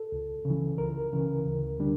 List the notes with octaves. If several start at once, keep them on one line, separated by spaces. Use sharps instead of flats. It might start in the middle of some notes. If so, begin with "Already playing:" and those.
Already playing: A4
C#2
C#3
E3
C#2 A#4
C#3 E3
D2
D3 G3 D4